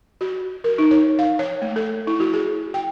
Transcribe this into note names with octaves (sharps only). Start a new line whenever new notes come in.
F#4
A#4
D#4
C#5
F5
C#5
A3
A4
E4
F#4
G#4
G5